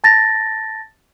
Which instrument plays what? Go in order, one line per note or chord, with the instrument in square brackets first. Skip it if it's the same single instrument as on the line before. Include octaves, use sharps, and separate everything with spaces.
[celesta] A5 A6 A#6